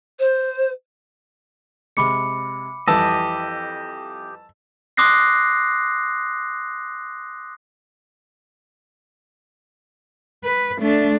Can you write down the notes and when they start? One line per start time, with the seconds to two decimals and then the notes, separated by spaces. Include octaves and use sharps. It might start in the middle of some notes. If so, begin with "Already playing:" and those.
0.19 C5
1.97 C3 G#3 B5 D6 C#7
2.88 F2 E3 G3 G4 D#5 A5 E6
4.97 C6 D6 D#6 F#6 A#6 C7
10.44 B4
10.80 A3 D4